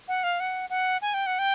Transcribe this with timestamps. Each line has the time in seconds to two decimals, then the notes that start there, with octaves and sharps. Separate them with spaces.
0.08 F#5
0.24 F5
0.40 F#5
0.70 F#5
1.02 G#5
1.14 G5
1.26 F#5
1.39 G5